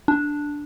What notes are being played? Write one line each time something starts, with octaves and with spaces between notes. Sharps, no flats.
D4